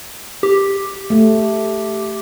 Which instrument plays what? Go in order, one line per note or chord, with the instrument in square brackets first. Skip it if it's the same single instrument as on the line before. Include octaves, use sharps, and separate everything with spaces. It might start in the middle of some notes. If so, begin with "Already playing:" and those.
[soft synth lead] G4
[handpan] A3